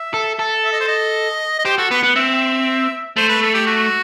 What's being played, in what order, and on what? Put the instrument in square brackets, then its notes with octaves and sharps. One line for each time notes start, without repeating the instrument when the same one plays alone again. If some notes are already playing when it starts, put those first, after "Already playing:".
Already playing: [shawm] E5
[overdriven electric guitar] A4
A4
[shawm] E5
D#5
C5
D#5
D#5
[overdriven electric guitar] G4 [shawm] C5
[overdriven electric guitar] F#4 [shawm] A4
[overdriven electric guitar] B3 [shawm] B4
[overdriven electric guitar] B3 [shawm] F#5
[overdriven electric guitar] C4 [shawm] E5
[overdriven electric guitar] A3 [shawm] C5
[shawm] B4
A4
G4
F#4